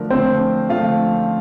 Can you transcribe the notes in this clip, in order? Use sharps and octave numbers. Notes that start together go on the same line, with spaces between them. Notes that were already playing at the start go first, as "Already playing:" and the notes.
Already playing: D3 F3 A3 A#4
D3 F3 A3 C4 C5
D3 F3 A3 F4 F5